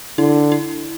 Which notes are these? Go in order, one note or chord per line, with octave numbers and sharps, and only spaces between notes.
D3 E4
E4